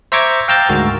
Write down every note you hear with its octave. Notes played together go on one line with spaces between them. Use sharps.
C5 E5 A#5 C#6 D6 G#6
F5 G5 A#5 E6 G6 A6
D2 G#2 F#4 A#4